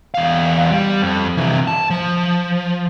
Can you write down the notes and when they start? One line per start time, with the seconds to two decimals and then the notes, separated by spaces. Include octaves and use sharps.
0.14 E2 F5
0.70 G3
1.02 F2
1.37 C3 E3
1.67 A5
1.90 F3